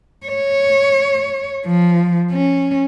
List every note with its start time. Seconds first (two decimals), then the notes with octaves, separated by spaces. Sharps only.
0.27 C#5
1.66 F3
2.32 C#4